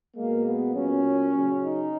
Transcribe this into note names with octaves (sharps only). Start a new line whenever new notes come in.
B2 G#3 A#3
B3
A#2 F#3 C#4
C#3 F#3
D#4